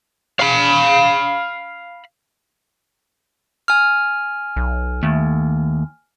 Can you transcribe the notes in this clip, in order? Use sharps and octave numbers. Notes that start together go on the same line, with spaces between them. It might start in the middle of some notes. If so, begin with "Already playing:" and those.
F5 B5
G#5 F6
B1
D#2 A3